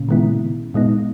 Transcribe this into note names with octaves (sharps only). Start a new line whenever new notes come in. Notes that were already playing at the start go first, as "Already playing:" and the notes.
Already playing: A#2 C#3
D#3 G#3 B3 E4
A#2 G#3 B3 D#4